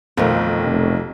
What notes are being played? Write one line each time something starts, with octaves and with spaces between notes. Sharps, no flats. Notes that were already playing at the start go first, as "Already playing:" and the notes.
B1 F2 D#3 A3
F1